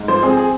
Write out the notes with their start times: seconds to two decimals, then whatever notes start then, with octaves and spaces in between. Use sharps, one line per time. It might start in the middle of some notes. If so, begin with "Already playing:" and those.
Already playing: G#2
0.08 F3 C5
0.23 C4 G#4
0.37 G#4